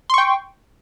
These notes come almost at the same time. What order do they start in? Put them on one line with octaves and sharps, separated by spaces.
C6 C#6 G5